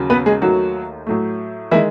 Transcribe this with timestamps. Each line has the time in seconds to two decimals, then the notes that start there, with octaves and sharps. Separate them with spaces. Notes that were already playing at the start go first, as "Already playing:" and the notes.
Already playing: D#2 C#3 F#3
0.10 B3 B4
0.26 G#3 G#4
0.42 D#2 D#3 F#3 A3 F#4
1.07 A2 F#3 A3
1.71 D#3 E3 G#3 E4